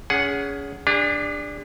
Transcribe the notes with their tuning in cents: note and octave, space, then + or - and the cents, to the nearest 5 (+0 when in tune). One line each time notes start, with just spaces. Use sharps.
C#4 +30 G#4 +0 F#5 +0
D4 +0 G#4 -45